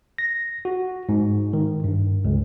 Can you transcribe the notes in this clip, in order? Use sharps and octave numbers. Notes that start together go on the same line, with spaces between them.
A#6
F#4
G#2
D#3
G2
C#2